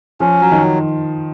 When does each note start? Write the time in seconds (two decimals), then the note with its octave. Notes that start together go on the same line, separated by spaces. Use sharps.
0.20 F3 C#4
0.41 F#3
0.51 D#3